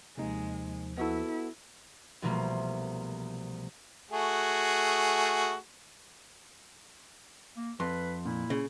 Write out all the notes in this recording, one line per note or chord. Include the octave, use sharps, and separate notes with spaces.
D#2 C3 F3 G#3 A#3 D#4
B3 E4 F#4 A4
C2 B2 E3 F3 A3 A#3
A3 F#4 G#4
A#3
F2 B4 C6
A#2 E4
C#3